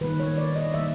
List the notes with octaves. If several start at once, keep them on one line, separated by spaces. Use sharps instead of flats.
D#3 G3 A#3 B4
C#5
D5
D#5
D#3 G3 A#3 E5